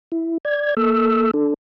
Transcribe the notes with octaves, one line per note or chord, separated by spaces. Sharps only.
E4
D5 G#6
A#3 A4 E6
D4 A4